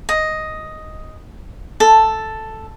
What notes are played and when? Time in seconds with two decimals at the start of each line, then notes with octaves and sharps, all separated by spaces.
0.09 D#5
1.80 A4